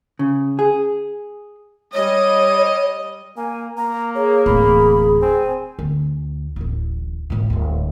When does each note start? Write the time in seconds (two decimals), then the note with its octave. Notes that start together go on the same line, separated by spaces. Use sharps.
0.19 C#3
0.59 G#4
1.94 G3 C#5 D#5
3.37 A#3 G#5
3.77 A#3 A#5
4.15 G#4 C#5
4.46 D1 E3 B5
5.22 C4 G#5
5.79 D2
6.56 D1 A1
7.30 G#1 A#2
7.50 D1 G#2